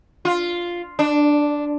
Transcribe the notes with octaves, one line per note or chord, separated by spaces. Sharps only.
F4
D4